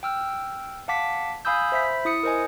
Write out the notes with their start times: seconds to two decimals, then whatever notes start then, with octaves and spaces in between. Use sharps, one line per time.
0.03 G5 E6 F6
0.88 F5 F#5 A5 D6 B6
1.45 F5 G#5 B5 D#6 E6 G6
1.72 C5 E5 B5 B6
2.05 E4 D#6 C#7
2.23 A#4 C5 D#5 G#5